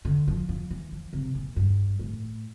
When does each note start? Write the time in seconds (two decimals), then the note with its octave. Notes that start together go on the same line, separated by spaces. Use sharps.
0.05 D3
0.28 F3
0.49 F3
0.71 E3
0.92 F3
1.13 C3
1.35 A#2
1.56 G2
2.00 A2